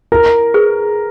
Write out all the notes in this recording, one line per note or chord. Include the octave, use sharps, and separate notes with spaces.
E4 A#4
G#4 B4